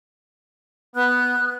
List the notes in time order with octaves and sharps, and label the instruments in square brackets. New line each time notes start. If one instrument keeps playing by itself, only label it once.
[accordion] B3 [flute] F#6